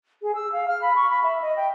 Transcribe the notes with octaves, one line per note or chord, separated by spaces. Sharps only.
G#4
E6
F5
F6
B5
C#6
B5
E5
D#5
G5